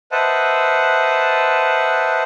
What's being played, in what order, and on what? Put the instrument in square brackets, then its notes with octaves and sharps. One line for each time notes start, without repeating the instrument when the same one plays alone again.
[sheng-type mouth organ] B4 C5 D#5 E5 F#5 A5